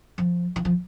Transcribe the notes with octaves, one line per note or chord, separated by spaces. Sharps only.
F3
E3
F3